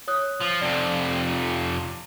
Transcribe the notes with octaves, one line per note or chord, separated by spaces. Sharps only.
C#5 D#6 F#6
F3
F2 C3 D5